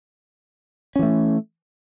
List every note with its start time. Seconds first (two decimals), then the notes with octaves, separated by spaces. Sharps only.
0.96 C#4
0.99 E3
1.03 A3